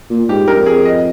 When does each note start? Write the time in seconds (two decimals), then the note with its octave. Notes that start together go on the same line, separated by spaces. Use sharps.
0.10 A#2
0.29 G#2 G4
0.48 G2 A#4
0.57 F2
0.66 G#4
0.85 D#5